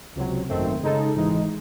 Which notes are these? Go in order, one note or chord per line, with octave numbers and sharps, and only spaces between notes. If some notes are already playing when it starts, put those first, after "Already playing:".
C#2 C3 F#3
G#1 F#2 D#3 A3 C4
C#3 G#3 D#4 A4
G#1 G#2 E3 G#3 D#4